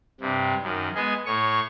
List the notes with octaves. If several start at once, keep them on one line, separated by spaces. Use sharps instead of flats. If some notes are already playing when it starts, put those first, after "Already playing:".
G2 C3
F#2 D#3
G#3 B3 G#4 D#5
A2 C#5 C#6